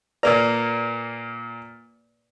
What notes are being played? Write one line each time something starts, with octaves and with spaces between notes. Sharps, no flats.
A#2 A#3 B4 D5 A#5